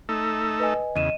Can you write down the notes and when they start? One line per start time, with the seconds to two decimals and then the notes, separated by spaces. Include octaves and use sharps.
0.09 A3 D#4 A4
0.60 B4 D#5 G#5
0.96 E2 C#3 D#5 D#7 E7